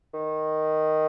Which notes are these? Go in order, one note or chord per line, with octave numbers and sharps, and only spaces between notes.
D#3